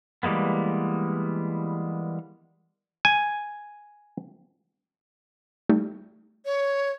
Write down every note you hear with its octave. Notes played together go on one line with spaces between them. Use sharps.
E3 G3 G#3 A#3 B3
G#5
G3 A3 D#4
C#5